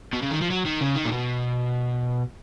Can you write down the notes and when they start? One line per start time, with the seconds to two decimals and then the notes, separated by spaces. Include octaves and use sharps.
0.13 B2
0.22 C#3
0.31 D#3
0.41 F3
0.50 F#3
0.65 D#3
0.81 C#3
0.96 D#3
1.06 A#2
1.11 B2